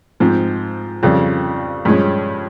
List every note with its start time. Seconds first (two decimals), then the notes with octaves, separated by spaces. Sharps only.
0.20 G#2 F3 C4
1.03 F2 C#3 G3
1.85 G2 F3 G#3 C#4